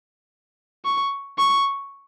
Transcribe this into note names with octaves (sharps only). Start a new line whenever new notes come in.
C#6
C#6